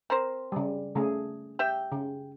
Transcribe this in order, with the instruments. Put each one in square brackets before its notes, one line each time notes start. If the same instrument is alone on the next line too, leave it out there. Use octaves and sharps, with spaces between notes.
[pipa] C4 A#4 C5
[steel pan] C#3 G3
C#3 A3 G#4
[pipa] G4 E5 G5
[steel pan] C#3